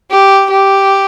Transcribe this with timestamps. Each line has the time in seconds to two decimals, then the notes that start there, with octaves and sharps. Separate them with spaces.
0.11 G4
0.50 G4